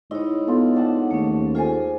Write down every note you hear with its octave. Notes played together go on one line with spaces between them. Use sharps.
G#2 E4 B4 C#5 D#5
B3 F4 A4
D4 F#5 A5
D#2 A3 C#4
F4 G#4 A4 C5 G#5